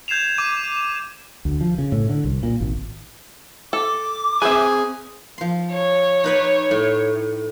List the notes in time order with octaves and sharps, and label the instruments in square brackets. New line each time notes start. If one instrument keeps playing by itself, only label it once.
[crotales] G6 G#6 C7 E7 F7
D6 D#7
[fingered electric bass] D2
F3
C#3
A2
D3
C2
A#2
G#1
[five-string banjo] A4 [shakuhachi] D6
[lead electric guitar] C4 G#5 [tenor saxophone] G#4 [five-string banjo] B4 C5 E5
[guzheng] F3 C6
[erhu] C#5
[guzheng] D#4 B4 D5
A2